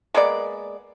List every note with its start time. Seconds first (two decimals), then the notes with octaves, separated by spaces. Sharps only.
0.14 G#3 A#3 B3 D5